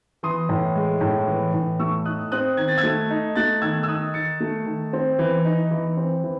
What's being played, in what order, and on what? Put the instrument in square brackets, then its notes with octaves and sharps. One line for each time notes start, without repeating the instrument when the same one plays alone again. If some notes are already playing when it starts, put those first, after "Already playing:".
[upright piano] E3 C6 D#6
A2
G#3
A2
E3
A2
A3 C#6 E6
D#4 D#6 F#6
C4 D#6 F#6
D#3 G#6
A6
E6 G#6
A3
D#4
A3 F#6 A6
D#3 E6 G#6
E6
D#4 D#6 F#6
D#3 A6 C#7
A3
D#3
C4
E3
D#4
E3
C4
E3